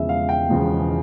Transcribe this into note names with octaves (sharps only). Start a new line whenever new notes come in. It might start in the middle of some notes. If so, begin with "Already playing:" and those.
Already playing: E1 E2 C#3 F3 G#3 E5
F5
G5
E1 E2 C#3 F3 G#3